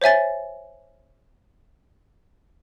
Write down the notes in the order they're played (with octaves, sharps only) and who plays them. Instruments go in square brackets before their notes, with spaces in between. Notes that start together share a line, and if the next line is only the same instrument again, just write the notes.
[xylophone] C5 C#5 E5 G#5 A6